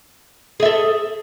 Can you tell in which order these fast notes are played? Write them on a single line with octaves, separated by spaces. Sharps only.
G#4 E5 A4